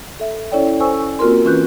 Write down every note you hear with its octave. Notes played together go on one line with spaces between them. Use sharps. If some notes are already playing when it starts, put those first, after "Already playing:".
A4 E5
C#4 E4 A4 C#5 D5 G5
A4 C5 G#5 C#6 E6
A#3 C4 F4 F#4 A#4 C6
E3 C#4 F4 B4 F#6 G6